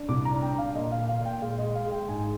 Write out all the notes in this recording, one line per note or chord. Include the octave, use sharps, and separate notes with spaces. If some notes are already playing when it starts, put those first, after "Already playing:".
Already playing: D4
C2 D6
A#5
D4
G5
D4
F5
A#2 D#5
F5
A#2
F5
A#2
G5
G#3 F5
D#5
G#3
F5
G#3
G5
G#2 G#5